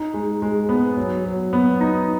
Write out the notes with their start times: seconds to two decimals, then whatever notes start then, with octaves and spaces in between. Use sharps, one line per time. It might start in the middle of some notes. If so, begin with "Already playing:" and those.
Already playing: D#4
0.14 G#3
0.42 G#3
0.69 B3
0.97 F#3
1.25 F#3
1.53 B3
1.81 D#4